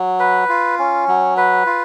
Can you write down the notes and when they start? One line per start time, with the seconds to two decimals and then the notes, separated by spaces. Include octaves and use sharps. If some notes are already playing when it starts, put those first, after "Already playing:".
Already playing: F#3
0.20 B4
0.49 F4
0.79 C#4
1.08 F#3
1.37 B4
1.66 F4